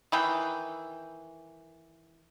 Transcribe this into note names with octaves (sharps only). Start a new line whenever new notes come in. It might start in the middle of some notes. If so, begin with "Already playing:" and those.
D#3 E3 G5